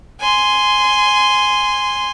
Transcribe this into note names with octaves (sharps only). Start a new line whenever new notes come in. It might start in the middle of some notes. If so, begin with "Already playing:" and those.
G#5 C6